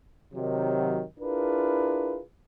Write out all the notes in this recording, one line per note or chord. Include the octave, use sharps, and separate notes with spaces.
C3 D#3 F#3
D4 E4 F4 G#4 A#4 B4